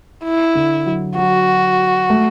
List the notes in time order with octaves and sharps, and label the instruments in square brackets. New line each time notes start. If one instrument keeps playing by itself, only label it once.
[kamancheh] E4
[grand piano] D3
F#3
[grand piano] F#3 [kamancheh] F#4
[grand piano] A3